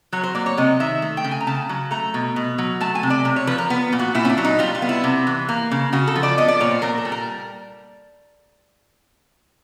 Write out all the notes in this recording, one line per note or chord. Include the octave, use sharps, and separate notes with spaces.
F#3 C#5
C5
A#3 D5
C#5
C3 D#5
D#3 E5
A3
G5
C#3
G#5
A#5
C#3 A5
F#3
A3 A#5
B2
B2
F#3
A3 A5
G#5
C3
D5
C3
C#5
F3 B4
A#4
B3
A#2
F#4
A#2 E4
C#4
D4
F#3
D#4
G3 F4
F4
B3
E4
C3
E3
A#3
C#3
C#3 F#4
A4
F3
D5
B3 D#5
D5
A#2 C#5
C5
A#2 A#4
A4
G3
A#4